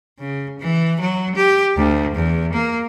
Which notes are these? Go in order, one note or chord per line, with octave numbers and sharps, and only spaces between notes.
C#3
E3
F#3
G4
D2
E2
A#3